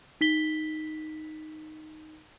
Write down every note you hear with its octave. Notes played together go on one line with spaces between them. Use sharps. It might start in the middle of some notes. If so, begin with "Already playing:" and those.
D#4 B6 G7